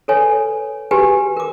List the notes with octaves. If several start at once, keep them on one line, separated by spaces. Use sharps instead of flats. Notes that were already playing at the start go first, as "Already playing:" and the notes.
A4 B4 C#5 G#5
F#4 G4 B4 G#5
A#4 D6